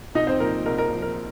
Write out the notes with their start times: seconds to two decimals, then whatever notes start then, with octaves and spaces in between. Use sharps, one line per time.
0.15 C2 D#4 D#5
0.27 C4 C5
0.40 A#2 F3 A#4
0.66 C2 A#4
0.78 A#4
0.90 A#2 F3
1.02 A#4